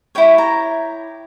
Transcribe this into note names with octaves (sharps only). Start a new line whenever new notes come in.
E4 G4 C#5 G5
A#5